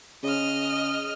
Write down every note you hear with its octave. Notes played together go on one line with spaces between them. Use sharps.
C#3 D#5 F6